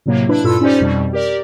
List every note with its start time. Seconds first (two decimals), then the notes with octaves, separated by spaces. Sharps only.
0.06 A2 C3 F#3 A#3
0.29 D4 E4 B4 B5
0.44 G2 A#2 F4 A4 B5 E6
0.61 C#4 D#4 G4 C5 D5
0.80 F2 B2 G3
1.13 G4 A#4 D5